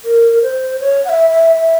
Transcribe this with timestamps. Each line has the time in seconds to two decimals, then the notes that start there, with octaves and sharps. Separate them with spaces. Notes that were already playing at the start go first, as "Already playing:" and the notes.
0.05 A#4
0.43 C5
0.81 C#5
1.05 F#5
1.09 E5
1.30 E5
1.56 E5